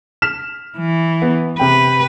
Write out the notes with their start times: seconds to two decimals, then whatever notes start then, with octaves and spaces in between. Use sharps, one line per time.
0.22 F6 B6 E7
0.78 E3
1.22 B3
1.59 C3 B4 G5